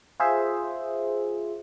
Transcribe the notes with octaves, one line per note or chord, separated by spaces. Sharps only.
F4 G#4 C5 E5